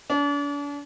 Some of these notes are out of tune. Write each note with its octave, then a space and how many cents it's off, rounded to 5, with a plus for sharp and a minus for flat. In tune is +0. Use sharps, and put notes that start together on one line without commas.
D4 -40